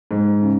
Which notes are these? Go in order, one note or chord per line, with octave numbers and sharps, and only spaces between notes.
G#2
C#3